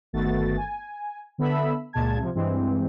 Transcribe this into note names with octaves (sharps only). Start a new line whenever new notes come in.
G1 D#3 A3 B3 F#4 A6
G#5
D3 B3 A4 E5 B5 E6
C#2 A#2 G#3 A5 G#6
C3 F3
G2 E3 G#3 C4